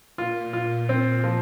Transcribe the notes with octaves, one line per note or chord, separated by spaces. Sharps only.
A#2 F4
F4
C4
F3